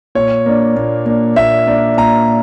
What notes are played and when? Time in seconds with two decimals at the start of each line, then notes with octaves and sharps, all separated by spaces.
0.15 A#2 C#5
0.46 A#3 D4
0.76 A#2
1.06 A#3 D4
1.36 A#2 E5
1.67 A#3 D4
1.98 A#2 A#5